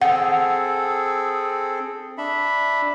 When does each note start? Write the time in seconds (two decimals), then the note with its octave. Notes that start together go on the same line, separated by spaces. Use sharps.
0.02 C4 G#4 A4 F#5
2.18 D4 E5 B5